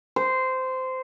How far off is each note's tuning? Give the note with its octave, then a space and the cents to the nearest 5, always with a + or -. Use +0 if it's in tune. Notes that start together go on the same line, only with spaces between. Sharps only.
C5 -15